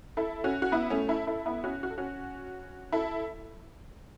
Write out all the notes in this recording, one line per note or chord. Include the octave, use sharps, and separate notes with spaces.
E4 A4
C#4 F#4
F#4
B3 E4
A3 C#4
E4 A4
E4 A4
B3 E4
C#4 F#4
F#4
A4
C#4 F#4
E4 A4